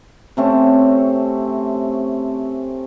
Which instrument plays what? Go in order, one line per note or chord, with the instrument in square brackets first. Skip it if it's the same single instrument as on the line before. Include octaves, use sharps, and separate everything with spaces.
[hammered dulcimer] C3 A3 C4 C#4